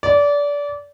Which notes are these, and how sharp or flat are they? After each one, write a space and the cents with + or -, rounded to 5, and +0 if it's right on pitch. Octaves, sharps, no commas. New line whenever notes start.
D5 -25